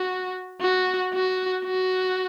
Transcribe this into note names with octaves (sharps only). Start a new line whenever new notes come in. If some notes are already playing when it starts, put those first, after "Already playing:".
Already playing: F#4
F#4
F#4
F#4